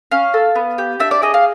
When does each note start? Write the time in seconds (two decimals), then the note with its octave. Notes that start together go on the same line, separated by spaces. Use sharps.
0.11 C#4 F5
0.34 A4
0.55 B3
0.78 G4
1.00 D4 E5
1.11 D5
1.22 G#4 D#5
1.34 F5